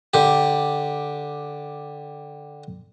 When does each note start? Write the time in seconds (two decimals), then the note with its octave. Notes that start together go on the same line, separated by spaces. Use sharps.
0.14 D3 G4